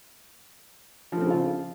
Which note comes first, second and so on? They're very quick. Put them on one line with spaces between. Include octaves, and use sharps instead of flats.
F3 A3 C4 C#3 F4